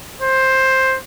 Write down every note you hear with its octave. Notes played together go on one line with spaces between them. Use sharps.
C5